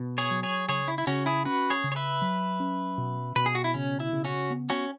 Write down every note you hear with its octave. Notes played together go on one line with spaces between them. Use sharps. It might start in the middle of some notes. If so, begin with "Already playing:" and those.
Already playing: B2
G#4 C#5
F#3
G#4 C#5
C#3 G#4 C#5
E4
E4
C#3 C#4 F#4
E4 G#4
C#4 F#4 B4
G#4 C#5
C#3
C#5
B4 E5
F#3
C#4
B2
B2 B4
G#4
F#4
E4
C#3 C#4
E4
C#3
C#4 F#4
B3
C#4 F#4